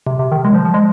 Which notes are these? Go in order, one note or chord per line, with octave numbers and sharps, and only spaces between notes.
C3
C3
D#3
G#3
F3
F3
G#3